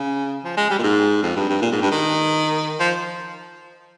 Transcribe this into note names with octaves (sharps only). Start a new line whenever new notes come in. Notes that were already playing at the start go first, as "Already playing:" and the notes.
Already playing: C#3
F3
G#3
G3
A#2
G#2
F2
G2
G2
A#2
G#2
G2
D#3
F3